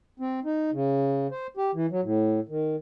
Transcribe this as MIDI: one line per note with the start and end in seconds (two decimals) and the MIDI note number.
0.20 0.40 60
0.45 0.71 63
0.72 1.27 49
1.31 1.47 72
1.57 1.71 67
1.74 1.86 52
1.91 2.01 54
2.03 2.40 45
2.49 2.76 51